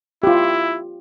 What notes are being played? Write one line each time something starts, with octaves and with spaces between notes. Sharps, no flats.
E4 F4 G4